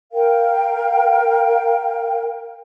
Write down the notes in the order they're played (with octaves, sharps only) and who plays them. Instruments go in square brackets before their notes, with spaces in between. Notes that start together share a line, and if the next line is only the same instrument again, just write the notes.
[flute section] A#4 F5 G5